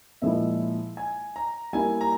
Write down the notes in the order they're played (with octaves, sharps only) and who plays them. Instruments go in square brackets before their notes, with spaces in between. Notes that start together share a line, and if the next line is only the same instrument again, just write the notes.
[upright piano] A#2 F3 G#3 E4 [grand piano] E5
[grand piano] G#5
A#5
[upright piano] G3 A#3 E4 [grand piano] G#5
[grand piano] A#5